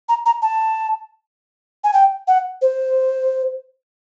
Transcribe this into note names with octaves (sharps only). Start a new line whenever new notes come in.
A#5
A#5
A5
G#5
G5
F#5
C5